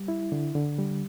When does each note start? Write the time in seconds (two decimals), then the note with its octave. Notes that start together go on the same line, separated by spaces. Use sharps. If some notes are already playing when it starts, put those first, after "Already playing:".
Already playing: G3
0.08 E4
0.32 D3
0.55 D3
0.79 G3